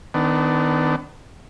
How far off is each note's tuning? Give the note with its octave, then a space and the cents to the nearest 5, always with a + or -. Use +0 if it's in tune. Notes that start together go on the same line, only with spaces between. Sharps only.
D#3 +0 B3 +35 D4 +0